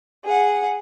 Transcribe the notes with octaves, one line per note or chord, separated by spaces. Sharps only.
G#4 F#5